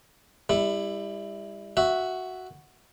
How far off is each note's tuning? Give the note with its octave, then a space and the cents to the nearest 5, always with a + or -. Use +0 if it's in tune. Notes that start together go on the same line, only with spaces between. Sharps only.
G3 +30 E4 +0
F#4 +0 E5 +0